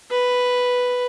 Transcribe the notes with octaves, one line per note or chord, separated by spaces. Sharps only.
B4